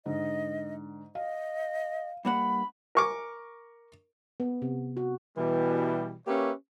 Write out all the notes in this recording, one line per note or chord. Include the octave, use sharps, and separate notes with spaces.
G#2 D3 D#5
D#5 F5
G2 A#3 F#5 B5
A#4 C#6 D6
B3
C3
F#4
B2 E3 G3
A#3 C#4 G4 B4 C#5 E5